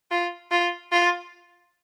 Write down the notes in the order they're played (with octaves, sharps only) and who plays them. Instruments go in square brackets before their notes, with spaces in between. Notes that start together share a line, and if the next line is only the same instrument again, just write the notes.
[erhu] F4
F4
F4